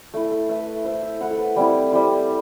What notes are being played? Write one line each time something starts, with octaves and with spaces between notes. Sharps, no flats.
A3 E4
A4
A3 E4 B4
A3 E4 C5
E5
A3 E4 F#5
A4
B4
G3 C4 E4
G3 C4 E4